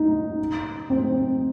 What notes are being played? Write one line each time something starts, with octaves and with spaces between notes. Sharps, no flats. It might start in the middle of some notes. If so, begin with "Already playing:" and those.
Already playing: D#4
C4